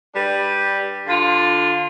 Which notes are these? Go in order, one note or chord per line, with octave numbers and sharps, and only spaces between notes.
G3 D4 B4
D3 F4